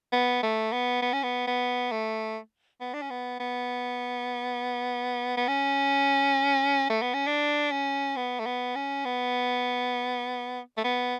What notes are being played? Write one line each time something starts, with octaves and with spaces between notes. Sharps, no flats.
B3
A3
B3
B3
C#4
B3
B3
A3
B3
D4
C#4
B3
B3
B3
C#4
A3
B3
C#4
D4
C#4
B3
A3
B3
C#4
B3
A3
B3